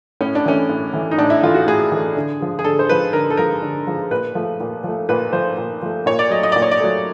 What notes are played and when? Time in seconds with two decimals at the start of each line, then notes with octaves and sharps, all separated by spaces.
0.21 A2 C#4
0.35 D4
0.46 E3 A3 C#4
0.70 A2
0.94 E3 A3
1.11 D#4
1.18 A2 D4
1.30 E4
1.43 E3 A3 F4
1.54 F#4
1.67 A2 G#4
1.92 E3 A3
2.16 D3
2.40 F3 G#3
2.59 G#4
2.64 D3 A4
2.79 C5
2.89 F3 G#3 B4
3.13 D3 A#4
3.30 A4
3.37 F3 G#3 A#4
3.62 D3
3.87 F3 G#3
4.11 A#2 B4
4.35 F3 A3
4.60 A#2
4.84 F3 A3
5.09 A#2 B4
5.33 F3 A3 C5
5.58 A#2
5.82 F3 A3
6.06 A#2 C#5
6.19 D5
6.30 F#3 A3 D#5
6.43 D#5
6.52 A#2 D5
6.62 C#5
6.71 D5
6.80 F#3 A3